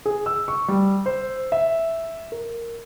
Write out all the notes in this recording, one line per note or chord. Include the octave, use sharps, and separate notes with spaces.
G#4
E6
C#6
G3
C5
E5
A#4